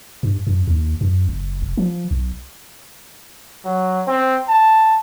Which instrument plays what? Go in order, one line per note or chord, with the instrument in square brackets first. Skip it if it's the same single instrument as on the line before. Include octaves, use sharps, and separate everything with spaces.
[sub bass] G2
F#2
D#2
F#2
F#1
F1
F3
B1
[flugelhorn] F#3
C4
A5